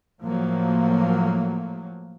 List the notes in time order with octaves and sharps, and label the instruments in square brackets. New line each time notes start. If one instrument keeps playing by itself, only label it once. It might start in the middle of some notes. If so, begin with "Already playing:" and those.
[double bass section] A2 F3 F#3 A#3